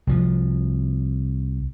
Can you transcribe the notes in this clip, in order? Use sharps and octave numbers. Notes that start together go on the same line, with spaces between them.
C2 F3